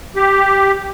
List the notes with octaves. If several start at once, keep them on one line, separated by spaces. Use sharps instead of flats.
G4